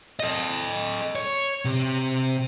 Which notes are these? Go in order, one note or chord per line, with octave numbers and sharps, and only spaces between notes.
A4 D#5
C#5
C3